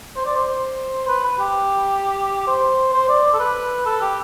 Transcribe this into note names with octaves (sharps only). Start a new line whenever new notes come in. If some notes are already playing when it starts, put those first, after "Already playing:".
C5
D5
C5
B4
B4
G4
C5
C5
D5
A4
B4
A4
G4